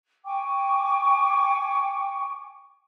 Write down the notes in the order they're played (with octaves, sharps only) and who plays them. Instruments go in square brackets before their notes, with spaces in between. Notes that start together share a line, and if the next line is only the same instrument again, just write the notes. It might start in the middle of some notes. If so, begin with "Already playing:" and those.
[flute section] G5 G#5 C#6 D6